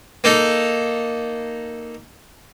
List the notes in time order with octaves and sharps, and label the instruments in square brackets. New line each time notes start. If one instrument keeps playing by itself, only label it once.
[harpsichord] A#3 D#4 A4